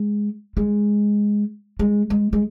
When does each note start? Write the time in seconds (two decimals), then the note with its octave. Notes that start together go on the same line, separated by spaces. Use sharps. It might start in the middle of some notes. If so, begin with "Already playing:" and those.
Already playing: G#3
0.57 G#3
1.79 G#3
2.10 G#3
2.33 G#3